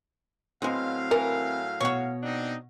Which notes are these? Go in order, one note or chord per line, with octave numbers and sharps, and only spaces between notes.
A2 F#3 G#3 B3 C4 F5
E3 A#4
B2 F#4 C#5
C4 D4 D#4